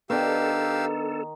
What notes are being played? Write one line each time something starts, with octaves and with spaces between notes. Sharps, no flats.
D#3 B3 D4 G4 A4 F5 E6